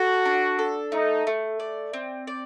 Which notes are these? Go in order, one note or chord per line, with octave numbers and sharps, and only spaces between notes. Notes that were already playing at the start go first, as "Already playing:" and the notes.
Already playing: F#4 A4
D4
A4
A3 D#4
A3
D5
C4
D5